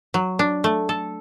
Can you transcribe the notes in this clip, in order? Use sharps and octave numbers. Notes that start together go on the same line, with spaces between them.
F#3
D4
A3
A4